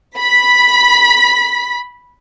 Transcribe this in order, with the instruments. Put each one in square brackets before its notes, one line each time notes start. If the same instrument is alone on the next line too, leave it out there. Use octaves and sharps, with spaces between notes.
[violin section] B5 B6